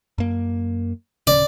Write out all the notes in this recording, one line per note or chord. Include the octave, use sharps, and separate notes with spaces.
F#2 A#3
D1 A#1 C#3 D5